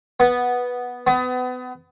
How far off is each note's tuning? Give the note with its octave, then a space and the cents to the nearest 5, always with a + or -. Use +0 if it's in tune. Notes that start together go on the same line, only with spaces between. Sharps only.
B3 -5
B3 +30